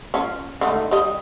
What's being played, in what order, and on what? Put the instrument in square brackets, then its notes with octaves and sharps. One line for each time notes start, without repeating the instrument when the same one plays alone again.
[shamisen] C#4 F4
D3 D#3 A3
G3 D#5